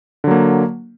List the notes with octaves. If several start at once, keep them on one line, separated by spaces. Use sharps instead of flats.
D3 F#3 A#3